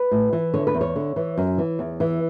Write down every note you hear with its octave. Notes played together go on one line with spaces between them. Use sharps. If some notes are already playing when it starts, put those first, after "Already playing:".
Already playing: B4
A2
E3
D3 C#5
B4
E2
C#5
D3
E3
F#2
E3
E2
E3